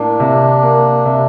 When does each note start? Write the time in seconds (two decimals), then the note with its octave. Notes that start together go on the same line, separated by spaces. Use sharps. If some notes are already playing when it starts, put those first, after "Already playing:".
Already playing: A2 A#3 D4
0.20 C3
0.63 A#3
1.05 C3